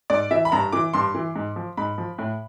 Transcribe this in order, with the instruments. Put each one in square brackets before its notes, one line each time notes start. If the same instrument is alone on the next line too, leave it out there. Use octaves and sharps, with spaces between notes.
[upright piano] G#2 D5
E3 E5
B5
G2 A#5
E3 D6
G2 C6
E3
G#2
F3
G#2 B5
F3
A2